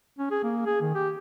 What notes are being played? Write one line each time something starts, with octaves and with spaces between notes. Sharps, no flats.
C#4
G#4
A#3
G#4
D#3
G4